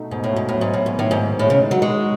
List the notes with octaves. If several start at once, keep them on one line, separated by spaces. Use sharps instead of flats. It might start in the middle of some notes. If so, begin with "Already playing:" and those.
Already playing: B2 A3 D#4
G#2 B2
A2
G#2 B2
A2
F#3
G#2
A2 B3
G#2
A2 D#3
G#2
D#3
A2 G#3
C#3
D#4
F#3
G#3 F#4